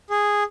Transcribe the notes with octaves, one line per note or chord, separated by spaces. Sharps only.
G#4